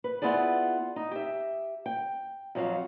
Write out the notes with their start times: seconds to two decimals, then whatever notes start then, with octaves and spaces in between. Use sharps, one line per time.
0.04 B4
0.22 B3 E4 F4 G#4 D5
0.96 D#4
1.11 G4 E5
1.86 G5
2.55 F2 F#3 F5